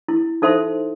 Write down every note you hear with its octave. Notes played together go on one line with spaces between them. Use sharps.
E4
D#4 A4 C5 E5 C6